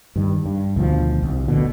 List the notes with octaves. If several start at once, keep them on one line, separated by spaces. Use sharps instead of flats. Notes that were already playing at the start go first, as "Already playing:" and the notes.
G2 D#3
G2
D2 B2 D#3 F3
C2
D1 A#1 B2 D3